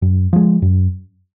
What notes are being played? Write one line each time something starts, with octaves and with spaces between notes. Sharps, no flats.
F#2
F3 G#3
F#2